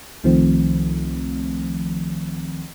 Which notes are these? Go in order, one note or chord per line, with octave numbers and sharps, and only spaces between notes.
C2 D#3 F3 A3 C4